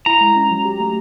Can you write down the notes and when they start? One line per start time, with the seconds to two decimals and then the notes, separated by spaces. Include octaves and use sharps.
0.06 E4 A#5
0.21 G#3
0.36 C#4
0.51 F#3
0.65 G4
0.80 A3